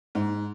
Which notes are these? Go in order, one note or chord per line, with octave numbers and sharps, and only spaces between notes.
G#2